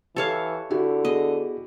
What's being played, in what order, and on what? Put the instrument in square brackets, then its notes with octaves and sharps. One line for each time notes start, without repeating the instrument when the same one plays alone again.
[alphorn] E3 [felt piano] G4 [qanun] A4 C#5 F5
[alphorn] D3 [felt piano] E4 F#4 G4
[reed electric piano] B3 G#4 [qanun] D#5